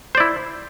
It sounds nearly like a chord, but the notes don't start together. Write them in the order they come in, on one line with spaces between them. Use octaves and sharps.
C5 D5 E4